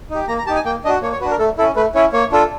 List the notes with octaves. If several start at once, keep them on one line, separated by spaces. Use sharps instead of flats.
D#4
G4
A#3 A#5
A#5
D#4 G4 A5
G#5
A#3 G5
D4 F#4 D#5
A#3 C#5
C#5
D4 F#4 B4
A#4
A3 A4
C#4 E4 A4
A3 B4
C#4 E4 C#5
A#3 C#5
D4 F4 A4